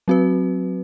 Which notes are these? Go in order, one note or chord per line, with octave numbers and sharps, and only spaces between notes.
F#3 C4 F#4 B4